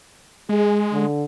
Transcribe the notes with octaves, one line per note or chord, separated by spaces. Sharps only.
G#3 G#4
D3